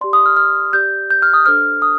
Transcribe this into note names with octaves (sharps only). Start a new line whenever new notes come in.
G4 D5 C6
D#6
F6
F6
G4 D5 G6
G6
F6
D#6
D4 A4 C5 F6
D#6